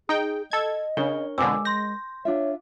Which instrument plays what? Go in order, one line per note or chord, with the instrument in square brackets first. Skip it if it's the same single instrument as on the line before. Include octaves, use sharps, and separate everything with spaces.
[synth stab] D#4 G5 [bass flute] G#4
[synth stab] A4 G#6 [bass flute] D#5
[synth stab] C#3 [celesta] D4 G7 [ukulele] A#4 C#5
[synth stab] F2 B2 D3 [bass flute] G#3 [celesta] G#5 D6 E6
[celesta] C6 G6 [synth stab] A#6
[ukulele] D4 F4 E5 [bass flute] C#5